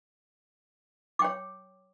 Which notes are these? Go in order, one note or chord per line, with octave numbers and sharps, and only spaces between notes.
C#5 G5 D6